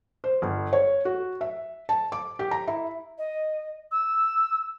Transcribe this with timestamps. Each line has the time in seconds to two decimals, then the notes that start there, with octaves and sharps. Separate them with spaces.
0.24 C5
0.42 G1
0.73 C#5
1.05 F#4
1.41 E5
1.89 A5
2.12 D6
2.39 G4
2.51 A#5
2.67 E4
3.18 D#5
3.92 E6